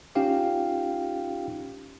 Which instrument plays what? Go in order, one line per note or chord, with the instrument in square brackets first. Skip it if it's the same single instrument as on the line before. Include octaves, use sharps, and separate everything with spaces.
[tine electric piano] C#4 D#4 F4 G4 F5 G5